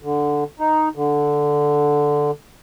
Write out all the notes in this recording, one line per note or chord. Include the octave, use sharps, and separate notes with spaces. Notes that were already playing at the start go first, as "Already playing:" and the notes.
D3
D#4
D3